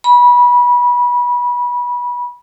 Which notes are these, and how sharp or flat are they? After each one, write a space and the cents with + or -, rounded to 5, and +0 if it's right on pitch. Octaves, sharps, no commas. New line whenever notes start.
B5 -25